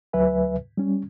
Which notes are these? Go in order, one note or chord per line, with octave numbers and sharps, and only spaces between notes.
D2 F#3 B4 E5 G#5
G3 C#4